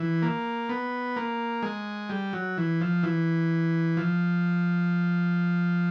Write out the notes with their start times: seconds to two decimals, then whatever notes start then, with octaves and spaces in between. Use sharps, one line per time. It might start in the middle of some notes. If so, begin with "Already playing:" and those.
Already playing: E3
0.22 A#3
0.69 B3
1.16 A#3
1.63 G#3
2.09 G3
2.33 F#3
2.58 E3
2.81 F3
3.03 E3
3.97 F3